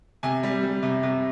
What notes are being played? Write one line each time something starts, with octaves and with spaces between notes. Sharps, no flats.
C3 G#5
G3
G3
C3
C3